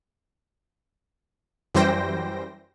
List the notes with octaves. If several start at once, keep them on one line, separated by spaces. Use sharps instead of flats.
F#2 E3 G3 C5 G5 A#6